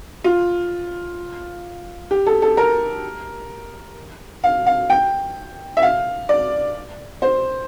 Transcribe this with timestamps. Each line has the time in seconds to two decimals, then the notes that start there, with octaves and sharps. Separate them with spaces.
0.24 F4
2.11 G4
2.27 A4
2.42 A4
2.57 A#4
4.44 F5
4.66 F5
4.90 G5
5.77 E5
5.82 F5
6.29 D5
7.22 C5